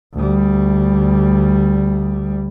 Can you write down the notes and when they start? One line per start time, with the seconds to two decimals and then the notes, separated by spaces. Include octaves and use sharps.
0.14 D2 G3